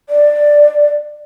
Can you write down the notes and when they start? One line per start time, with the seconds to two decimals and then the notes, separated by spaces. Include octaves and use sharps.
0.09 D5